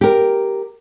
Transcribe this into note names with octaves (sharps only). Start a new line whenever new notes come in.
G4 A#4